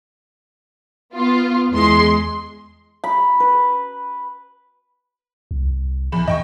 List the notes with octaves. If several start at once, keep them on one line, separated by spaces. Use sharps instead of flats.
B3 F4
E2 G#3 C6
B5
B4
C2
E2 B5 E7
E2 D#5 G5 C#6